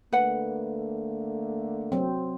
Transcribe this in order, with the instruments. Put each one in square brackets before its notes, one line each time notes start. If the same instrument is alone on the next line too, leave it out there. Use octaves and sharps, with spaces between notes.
[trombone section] D3 A3 A#3 [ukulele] B4 F#5
[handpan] F#3 C4